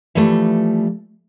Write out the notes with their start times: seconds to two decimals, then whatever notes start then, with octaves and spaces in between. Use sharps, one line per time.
0.15 E3 F3 G3 A3